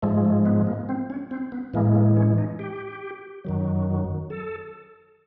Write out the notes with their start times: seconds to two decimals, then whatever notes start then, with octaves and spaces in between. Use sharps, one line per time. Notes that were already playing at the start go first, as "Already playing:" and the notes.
0.03 G#2 F3 G#3 A3
0.25 A3
0.46 B3
0.67 A#3
0.89 C4
1.10 C#4
1.31 C4
1.52 B3
1.74 A2 E3 G#3 A#3
1.95 A#3
2.17 C#4
2.38 D#4
2.59 G4
3.45 F#2 D#3 F#3
4.30 A4